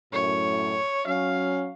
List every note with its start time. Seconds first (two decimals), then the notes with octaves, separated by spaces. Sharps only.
0.13 F#2 A2 C#5
1.07 F#3 C#4 F5